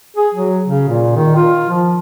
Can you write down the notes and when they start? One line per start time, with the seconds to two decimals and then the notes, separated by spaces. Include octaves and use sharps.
0.17 G#4
0.34 F#3
0.67 C#3
0.88 A#2
1.16 D#3
1.36 F4
1.69 F3